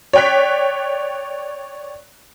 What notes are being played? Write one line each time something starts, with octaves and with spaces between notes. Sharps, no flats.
C#5 D5 G5 F#6 B6